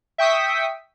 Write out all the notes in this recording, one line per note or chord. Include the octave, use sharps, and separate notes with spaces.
E5 G5 C#6 D#6 B6